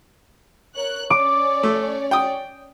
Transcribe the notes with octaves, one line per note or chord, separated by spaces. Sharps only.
A#4 C#5 F#6
C#4 C#5 D5 D6
A3
G5 D#6